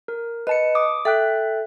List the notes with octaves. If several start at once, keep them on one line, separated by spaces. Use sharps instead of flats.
A#4
B4 D#5 A5 C#7
D6 D#6
A4 E5 G5 F#6